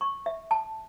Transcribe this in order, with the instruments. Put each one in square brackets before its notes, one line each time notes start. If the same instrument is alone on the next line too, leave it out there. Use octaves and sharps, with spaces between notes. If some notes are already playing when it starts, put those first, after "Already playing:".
[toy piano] C#6
E5
A5